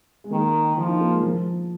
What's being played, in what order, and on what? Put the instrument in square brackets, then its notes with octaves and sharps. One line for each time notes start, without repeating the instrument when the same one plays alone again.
[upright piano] G#3
[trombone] D#3 [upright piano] A#3
[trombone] F3 [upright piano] F4
[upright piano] D#4
A#3
G#3
F3